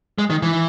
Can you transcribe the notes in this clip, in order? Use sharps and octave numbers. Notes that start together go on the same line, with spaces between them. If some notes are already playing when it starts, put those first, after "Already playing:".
G#3
D#3
E3